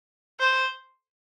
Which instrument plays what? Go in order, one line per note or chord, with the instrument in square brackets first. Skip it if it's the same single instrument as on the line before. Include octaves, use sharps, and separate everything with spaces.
[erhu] C5